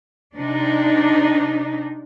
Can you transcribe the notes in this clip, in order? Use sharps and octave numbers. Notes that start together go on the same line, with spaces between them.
C3 D4 D#4